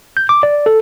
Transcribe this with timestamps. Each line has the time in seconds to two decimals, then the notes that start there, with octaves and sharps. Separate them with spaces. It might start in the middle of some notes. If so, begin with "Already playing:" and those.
0.17 G6
0.29 D6
0.43 D5
0.66 A4